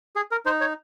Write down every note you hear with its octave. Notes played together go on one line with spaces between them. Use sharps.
G#4
A#4
D#4 C5
C#5